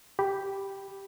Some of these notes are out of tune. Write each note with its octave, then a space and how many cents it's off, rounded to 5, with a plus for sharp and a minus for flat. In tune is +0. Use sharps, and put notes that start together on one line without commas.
G4 +0 B5 +0